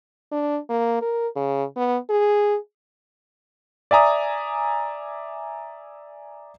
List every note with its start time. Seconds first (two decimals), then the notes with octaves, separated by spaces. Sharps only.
0.32 D4
0.70 A#3
1.01 A#4
1.36 C#3
1.76 B3
2.10 G#4
3.91 D5 E5 G#5 A#5 D#6